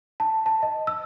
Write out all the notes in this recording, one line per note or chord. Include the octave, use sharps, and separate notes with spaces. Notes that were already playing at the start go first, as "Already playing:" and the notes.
A5
A5
D#5
E6